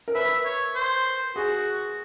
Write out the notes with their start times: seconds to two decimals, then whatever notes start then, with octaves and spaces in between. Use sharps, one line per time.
0.08 A#4
0.15 B4 E5
0.45 C#5
0.75 C5
1.36 F#4 G#4